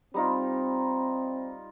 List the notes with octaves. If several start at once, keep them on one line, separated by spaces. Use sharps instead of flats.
G3 C4 D#4 F4